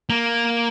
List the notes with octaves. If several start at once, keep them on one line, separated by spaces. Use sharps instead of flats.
A#3